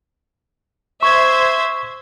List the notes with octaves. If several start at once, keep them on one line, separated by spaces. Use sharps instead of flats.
C5 E5 C#6 G#6